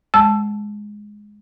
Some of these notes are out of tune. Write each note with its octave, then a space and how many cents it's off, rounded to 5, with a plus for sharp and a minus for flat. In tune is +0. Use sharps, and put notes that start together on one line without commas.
G#3 +0 A5 -10 E6 +15